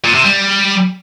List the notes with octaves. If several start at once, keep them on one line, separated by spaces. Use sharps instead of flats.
A#2
C3
G3